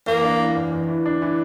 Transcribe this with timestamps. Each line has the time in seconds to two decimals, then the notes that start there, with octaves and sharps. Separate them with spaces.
0.06 E2 A#3
0.23 D4
0.39 E3
0.56 E2
0.72 E2
0.88 E3
1.06 D4
1.22 E3